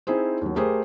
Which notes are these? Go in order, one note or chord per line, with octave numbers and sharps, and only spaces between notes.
C4 D#4 E4 G#4 C5
D#2 F#3
A3 G4 G#4 A#4 C5